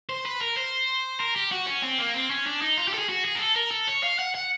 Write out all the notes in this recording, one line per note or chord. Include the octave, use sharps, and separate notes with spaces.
C5
B4
A#4
C5
A#4
G4
F#4
C#4
C4
A#3
C4
C#4
D4
D#4
F4
G4
A4
G#4
F#4
G#4
A#4
A4
A#4
A4
C#5
F5
F#5
F#5